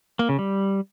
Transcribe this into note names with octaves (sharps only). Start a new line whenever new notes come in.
A#3
C#3
G3